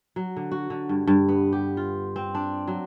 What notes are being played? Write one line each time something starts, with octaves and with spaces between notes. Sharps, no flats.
F#3
D3
F#4
D3
G2
G2
B3
G4
F4
C4
D4
F#3